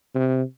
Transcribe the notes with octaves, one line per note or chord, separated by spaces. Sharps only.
C3